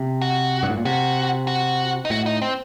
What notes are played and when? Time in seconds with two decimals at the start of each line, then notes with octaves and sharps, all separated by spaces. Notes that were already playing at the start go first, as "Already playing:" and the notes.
Already playing: C3
0.21 F#4
0.63 G2
0.69 A2
0.77 A#2
0.85 C3 F#4
1.47 F#4
2.05 D#4
2.10 A2 F#4
2.26 D#4
2.42 C4